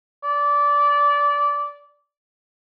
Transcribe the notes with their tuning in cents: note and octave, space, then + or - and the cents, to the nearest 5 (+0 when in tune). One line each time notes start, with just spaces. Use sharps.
D5 -20